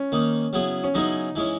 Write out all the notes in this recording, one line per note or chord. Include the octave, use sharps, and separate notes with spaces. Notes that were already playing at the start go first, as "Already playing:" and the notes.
Already playing: C#4
D#3 A#3 D#4
C#3 F#3 B3 E4 G#4
C#4
C#3 F#3 B3 D#4 E4 G#4
E3 G#3 C#4